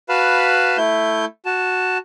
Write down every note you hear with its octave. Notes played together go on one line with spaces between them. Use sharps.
F#4 B4 F5 A5 B5
A3 E4 G6
F#4 A5